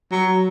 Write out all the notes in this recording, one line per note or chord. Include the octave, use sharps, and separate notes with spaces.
F#3